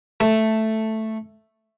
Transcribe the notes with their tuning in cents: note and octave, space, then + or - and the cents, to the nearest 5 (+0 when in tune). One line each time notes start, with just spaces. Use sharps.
A3 +0 A4 +5